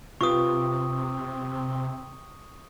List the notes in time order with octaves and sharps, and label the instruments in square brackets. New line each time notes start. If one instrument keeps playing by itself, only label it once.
[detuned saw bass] C3 [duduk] C4 [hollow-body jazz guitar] F4 G4 B4 [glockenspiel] C#6 D#6